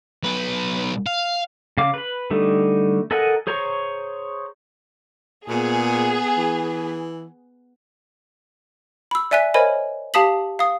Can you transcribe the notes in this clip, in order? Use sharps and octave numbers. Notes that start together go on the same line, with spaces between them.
B1 B4
F5
C#3 F5 D6
B4 B5
D3 G3 A3 D#4
A4 A#4 D#5 F#5 G#5
G#4 C5 C#5 A#5 C#6
A#2 B3 G#4
E3
B5 E6
D5 E5 G#5 F#6 B6
A#4 C5 C#5 D#5 G#5 B5
G4 F5 A5 D#6 B6 F#7
F5 D#6